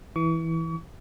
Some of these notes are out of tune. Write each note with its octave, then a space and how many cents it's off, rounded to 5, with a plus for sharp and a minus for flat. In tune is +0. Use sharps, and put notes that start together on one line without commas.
E3 -10 C#6 +40